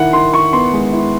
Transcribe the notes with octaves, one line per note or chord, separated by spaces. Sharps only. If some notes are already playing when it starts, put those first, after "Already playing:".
Already playing: D#3 E4 F#5
D#3 C6
E4 C#6
B3 C6
G#3
E4